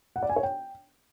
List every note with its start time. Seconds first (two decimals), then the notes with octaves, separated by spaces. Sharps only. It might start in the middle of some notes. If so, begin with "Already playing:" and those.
0.16 F#5
0.23 D5
0.30 G#5
0.36 C#5
0.43 G5